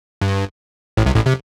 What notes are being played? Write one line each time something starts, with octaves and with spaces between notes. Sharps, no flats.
G2
A1 A2
C2 C3
A1 A2
C3